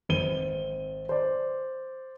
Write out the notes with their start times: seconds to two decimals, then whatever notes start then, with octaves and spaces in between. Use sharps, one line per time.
0.09 G#1 C4 D#7 G7
1.09 C5 D5